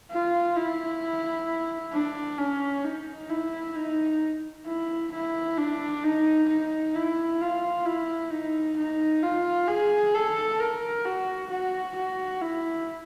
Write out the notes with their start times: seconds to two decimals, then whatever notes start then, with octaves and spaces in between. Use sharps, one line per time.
0.11 F4
0.56 E4
1.93 D4
2.39 C#4
2.84 D#4
3.30 E4
3.76 D#4
4.66 E4
5.12 E4
5.57 D4
6.04 D#4
6.49 D#4
6.95 E4
7.41 F4
7.85 E4
8.31 D#4
8.77 D#4
9.23 F4
9.68 G#4
10.15 A4
10.60 A#4
11.05 F#4
11.50 F#4
11.96 F#4
12.42 E4